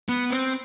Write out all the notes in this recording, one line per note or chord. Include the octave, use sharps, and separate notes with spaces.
B3
C4